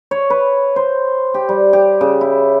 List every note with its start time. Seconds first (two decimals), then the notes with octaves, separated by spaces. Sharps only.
0.11 C#5
0.30 B4
0.76 C5
1.34 G4
1.49 G3
1.73 G4
2.01 C#3
2.21 E4